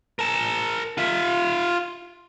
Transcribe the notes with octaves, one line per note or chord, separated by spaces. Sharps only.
A#4 A5
F4 E5